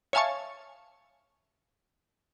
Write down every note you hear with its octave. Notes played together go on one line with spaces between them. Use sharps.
C#5 E5 F5 G#5 A5 C#6